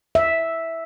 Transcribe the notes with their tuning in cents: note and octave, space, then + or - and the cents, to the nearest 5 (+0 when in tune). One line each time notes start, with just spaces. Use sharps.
E5 -5